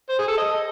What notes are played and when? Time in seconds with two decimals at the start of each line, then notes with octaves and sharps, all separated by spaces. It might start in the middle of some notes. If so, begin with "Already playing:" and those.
0.09 C5
0.19 G#4
0.28 A4
0.37 D#5